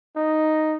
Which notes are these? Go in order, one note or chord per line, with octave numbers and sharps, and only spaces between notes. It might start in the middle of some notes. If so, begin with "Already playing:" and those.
D#4